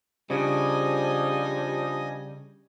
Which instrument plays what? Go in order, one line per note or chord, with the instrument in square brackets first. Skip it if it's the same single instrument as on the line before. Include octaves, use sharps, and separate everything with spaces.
[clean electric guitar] C#3 [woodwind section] F3 D4 [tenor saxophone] G3 [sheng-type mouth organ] D#5 G#5 D#6